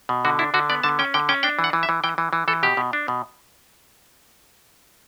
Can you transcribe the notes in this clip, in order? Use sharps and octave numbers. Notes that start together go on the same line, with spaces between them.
B2
D3 F#4
D4 E4
D3 F#4
B3 D5
D3 A5
C#4 G5
D3 G5
C#4 G5
D4 G5
E3
F#5
E3
E5
E3
E3 G5
E3
E3
E3 A4
B2 G4
B2
D4
B2